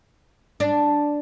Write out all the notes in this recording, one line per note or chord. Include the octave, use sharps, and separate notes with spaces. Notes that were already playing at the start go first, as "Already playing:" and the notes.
D4